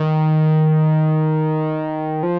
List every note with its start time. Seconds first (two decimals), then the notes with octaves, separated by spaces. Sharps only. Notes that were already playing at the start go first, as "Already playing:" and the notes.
Already playing: D#3
2.23 F3